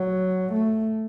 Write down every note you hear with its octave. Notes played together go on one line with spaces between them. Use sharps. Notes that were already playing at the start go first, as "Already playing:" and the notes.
Already playing: F#3
A3